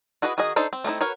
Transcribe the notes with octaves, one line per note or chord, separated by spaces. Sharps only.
E4 F#4 G#4 B4 D#5
D#3 F#4 G#4 D#5
D4 D#4 A4 C5
C4
A3 C4 D#4 E4
F#4 A#4 B4 C#5